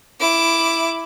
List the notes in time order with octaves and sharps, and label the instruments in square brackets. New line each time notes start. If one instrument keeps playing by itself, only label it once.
[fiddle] E4 D6